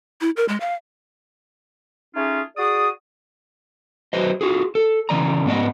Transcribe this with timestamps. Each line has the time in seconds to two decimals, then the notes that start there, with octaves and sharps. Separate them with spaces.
0.21 E4
0.37 A#4
0.49 G#3
0.60 F5
2.15 A3 C#4 D#4 F4 G#4
2.57 F#4 G#4 D5 D#6
4.13 F#3 B4 C5 D#5
4.41 F4 F#4 G#4
4.75 A4
5.09 C#3 E3 D5 A#5
5.46 G#2 B3 D5 D#5